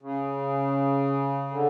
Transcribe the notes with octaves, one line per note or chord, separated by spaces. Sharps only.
C#3
D3